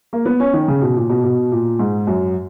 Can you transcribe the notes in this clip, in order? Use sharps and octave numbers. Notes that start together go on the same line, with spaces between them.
A#3
B3
C#4
D#3
C#3
B2
A#2
B2
B2
A#2
G#2
F#2